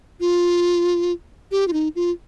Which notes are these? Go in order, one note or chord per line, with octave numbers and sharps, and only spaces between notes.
F4
G4
F4
D#4
F4